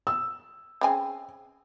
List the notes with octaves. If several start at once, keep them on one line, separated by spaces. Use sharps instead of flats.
E6
C#3 C4 G#5